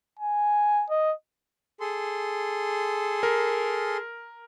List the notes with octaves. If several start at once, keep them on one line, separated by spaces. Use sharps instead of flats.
G#5
D#5
G#4 A4 C6
A#4